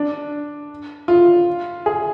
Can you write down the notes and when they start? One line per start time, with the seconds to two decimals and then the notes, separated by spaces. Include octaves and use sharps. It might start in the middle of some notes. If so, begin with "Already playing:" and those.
Already playing: D4
1.08 F4
1.86 G#4